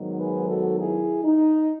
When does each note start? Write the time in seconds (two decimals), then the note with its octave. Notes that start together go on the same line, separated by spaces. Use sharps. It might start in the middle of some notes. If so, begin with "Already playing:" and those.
Already playing: G#2 D#3 F#3 B3 D#4
0.18 G#4 B4
0.49 F#4 A4
0.79 E4 G#4
1.24 D#4